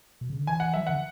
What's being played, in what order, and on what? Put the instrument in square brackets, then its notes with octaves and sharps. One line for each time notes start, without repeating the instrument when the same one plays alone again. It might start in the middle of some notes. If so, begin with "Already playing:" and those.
[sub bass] B2
C#3
D3
[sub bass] E3 [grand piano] G#5
[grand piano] F#5
[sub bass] F#3 [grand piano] E5
[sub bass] E3
[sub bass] D3 [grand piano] F#5